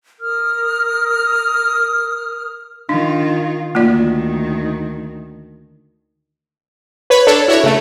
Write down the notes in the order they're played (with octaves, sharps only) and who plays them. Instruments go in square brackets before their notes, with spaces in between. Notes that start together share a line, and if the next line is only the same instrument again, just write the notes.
[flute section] A#4 D#6 F6
[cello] D#3 F4 [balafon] D4
[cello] D2 D#3 [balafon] A#3 F4 D5
[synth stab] B4 C#5 B5
D4 A4 C#5
E4 F#4 C#5
C#3 A3